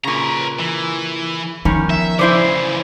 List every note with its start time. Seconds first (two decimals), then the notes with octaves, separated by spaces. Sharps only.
0.04 A#2 C#3 B4 A#5
0.60 E3
1.65 E2 D#3 F3 C#4
1.90 E5
2.19 C#3 E3 E4 C5 D5